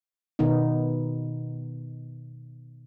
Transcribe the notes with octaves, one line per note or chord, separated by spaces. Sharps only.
B2 D#3 B3 D#4